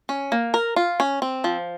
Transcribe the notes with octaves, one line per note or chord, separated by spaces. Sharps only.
C#4
A#3
A#4
F4
C#4
C4
F3